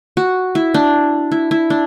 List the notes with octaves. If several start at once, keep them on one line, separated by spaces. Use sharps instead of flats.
F#4
E4
D4
E4
E4
D4